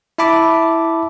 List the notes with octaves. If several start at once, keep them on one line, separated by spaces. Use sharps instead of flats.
E4 E5 A5 B5 D6